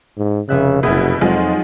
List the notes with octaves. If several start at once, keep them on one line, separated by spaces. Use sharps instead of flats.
G#2
F1 C#3 E5 F#6
F#1 B2 B3 E4 G#4
F2 F3 F#3 G#3 D#4 F4